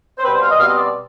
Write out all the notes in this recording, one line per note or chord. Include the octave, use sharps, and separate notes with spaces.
C5
B2 G3 C4 B4
C5
F5
D#5
B2 G3 C4 F5
D#5
D5